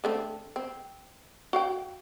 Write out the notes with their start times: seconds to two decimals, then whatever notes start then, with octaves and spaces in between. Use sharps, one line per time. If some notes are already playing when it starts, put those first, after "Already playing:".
0.04 D3 A3 C4
0.56 C4
1.53 F#4 F5 G5